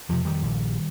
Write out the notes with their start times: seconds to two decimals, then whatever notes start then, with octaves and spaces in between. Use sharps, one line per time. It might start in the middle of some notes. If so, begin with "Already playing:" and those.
0.09 F2 C3 F3
0.25 D#3 G3
0.43 A#1